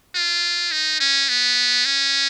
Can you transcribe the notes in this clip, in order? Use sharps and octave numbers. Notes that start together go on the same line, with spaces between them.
F4
D#4
C#4
B3
C#4